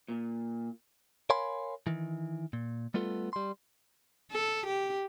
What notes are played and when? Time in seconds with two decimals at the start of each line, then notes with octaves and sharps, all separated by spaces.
0.08 A#2
1.30 A#4 C#5 F5 G#5 B5 C6
1.87 D#3 E3
2.53 A#2
2.94 G3 A3 B3 F4 A4
3.33 G3 C6
4.31 A4
4.67 G4